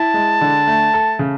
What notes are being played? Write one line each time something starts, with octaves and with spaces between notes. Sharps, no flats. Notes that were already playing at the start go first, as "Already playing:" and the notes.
Already playing: E4 A5
G#3
D3
A3
A4
C#3